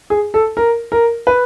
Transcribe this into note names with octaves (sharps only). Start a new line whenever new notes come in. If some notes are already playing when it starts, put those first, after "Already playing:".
G#4
A4
A#4
A#4
B4